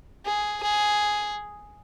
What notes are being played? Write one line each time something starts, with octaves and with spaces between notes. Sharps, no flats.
G#4
G#4